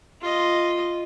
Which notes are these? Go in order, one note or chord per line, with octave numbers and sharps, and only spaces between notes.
F4 D#5